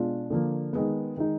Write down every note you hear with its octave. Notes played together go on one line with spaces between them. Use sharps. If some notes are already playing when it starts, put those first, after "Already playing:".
Already playing: B2 G#3 D4 F4
D3 F3 A#3
D#3 G#3 B3
D#3 G#3 D#4